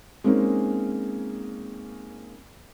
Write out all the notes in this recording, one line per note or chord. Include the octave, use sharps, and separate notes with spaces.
G#3 A#3 C4 C#4 D#4